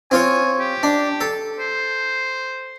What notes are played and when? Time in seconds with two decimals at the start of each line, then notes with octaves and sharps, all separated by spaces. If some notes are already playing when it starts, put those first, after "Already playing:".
0.11 C4 F4 C#5 G#5
0.60 G4
0.83 D4
1.21 A4
1.59 C5